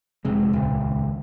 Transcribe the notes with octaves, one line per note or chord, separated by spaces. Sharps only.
F1 C3 G#3
D#1 C#2